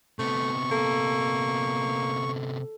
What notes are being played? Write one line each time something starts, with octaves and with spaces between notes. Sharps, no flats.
C3 A3 B3 C#6
A#3 A4